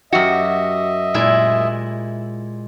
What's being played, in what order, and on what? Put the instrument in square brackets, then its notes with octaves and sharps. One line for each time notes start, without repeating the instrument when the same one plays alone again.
[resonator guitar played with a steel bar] F#2 F#4 [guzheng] G4 [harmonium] D#5 E5
[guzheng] A#2 G#3 E4